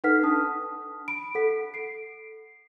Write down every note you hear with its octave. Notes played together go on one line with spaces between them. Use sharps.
D#4 A4 B4 F#5 F6 B6
D4 A5 D#6
B5 D7
A4 F#5 B6
C7 D7